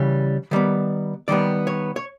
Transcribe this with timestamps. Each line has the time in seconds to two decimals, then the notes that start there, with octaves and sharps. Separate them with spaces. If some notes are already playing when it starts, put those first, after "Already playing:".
Already playing: C#3 E3 G3
0.51 D#3 G3 B3
1.28 D#3 G3 B3 D5
1.67 C#5
1.96 C#5